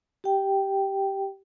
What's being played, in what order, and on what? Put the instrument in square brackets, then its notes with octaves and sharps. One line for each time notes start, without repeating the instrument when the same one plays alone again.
[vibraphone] G4 G5